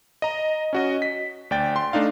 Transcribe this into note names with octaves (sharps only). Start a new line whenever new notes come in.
D#5 A#5
C#4 F#4 D#5
B6
D2 D5 G5 A6
C6
A3 D4 D#4 F5